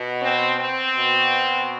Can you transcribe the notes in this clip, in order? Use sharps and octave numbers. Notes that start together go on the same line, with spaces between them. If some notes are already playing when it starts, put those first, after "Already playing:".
Already playing: B2
C4
C4
B2